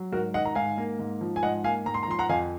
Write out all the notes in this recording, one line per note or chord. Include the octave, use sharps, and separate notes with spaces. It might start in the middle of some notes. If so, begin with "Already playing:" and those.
Already playing: F#3
G#2 F#4 A#4
D#3 D#5 F#5
A#5
G#2 F5 G#5
A#3
G#2
F3
G#5
G#2 D#5 F#5
A#3 F5 G#5
G#2 A#5
C6
A#5
F3 C6
F#5 A#5
F2 F5 G#5